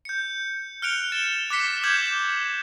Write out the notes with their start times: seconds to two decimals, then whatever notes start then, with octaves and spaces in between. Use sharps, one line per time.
0.05 G6 C#7
0.82 F6 F#6 C#7 D7 F7 G7
1.12 A6 E7
1.50 D6 F#6 A6 B6 C#7
1.84 D6 F6 G6 G#6 E7 F#7